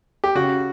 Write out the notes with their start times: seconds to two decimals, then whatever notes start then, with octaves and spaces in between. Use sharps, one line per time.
0.24 G4
0.35 C#3 F#4